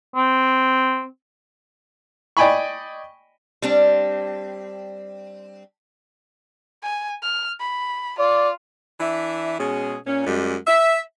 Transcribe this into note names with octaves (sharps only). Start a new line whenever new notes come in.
C4
D5 D#5 G5 G#5 B5 C#6
G3 C4 D4
G#5
F6
B5
F4 D5
E3 D4 E5
B2 G#3 C#4 G#4
A#2 C#4
F#2 G3 G#3
E5